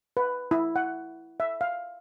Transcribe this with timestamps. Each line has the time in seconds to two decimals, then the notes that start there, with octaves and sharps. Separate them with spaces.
0.17 B4
0.51 E4
0.76 F#5
1.40 E5
1.61 F5